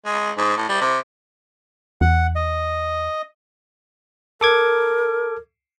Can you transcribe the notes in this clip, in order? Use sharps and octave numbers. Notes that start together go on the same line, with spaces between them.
G#3
G#2
A2
G3
C3
E2 F#5
D#5
A4 A#4 D6 G#6